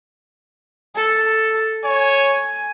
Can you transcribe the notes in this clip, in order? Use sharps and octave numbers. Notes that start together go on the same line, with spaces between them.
A4
C#5 G#5